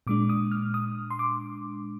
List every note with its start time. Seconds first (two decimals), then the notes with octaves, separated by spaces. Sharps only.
0.07 A#2 G#3 D4 D6
0.29 D#6
0.52 F6
0.74 D#6
1.11 C6
1.19 D6